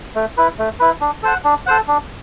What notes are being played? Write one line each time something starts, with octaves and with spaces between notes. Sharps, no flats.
A3
E4 B4
A3
E4 B4
D4
A4 C5 F#5
D4
A4 C5 F#5
D4